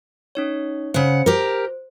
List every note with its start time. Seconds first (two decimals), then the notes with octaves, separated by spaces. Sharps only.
0.35 C#4 D#4 C#5
0.94 C#3 C5 F#5
1.26 G4 A#4